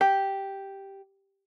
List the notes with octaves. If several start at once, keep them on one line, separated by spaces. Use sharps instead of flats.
G4